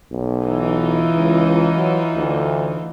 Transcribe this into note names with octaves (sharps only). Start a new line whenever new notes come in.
B1
E3 D#4 F4
C#2
F#3
D2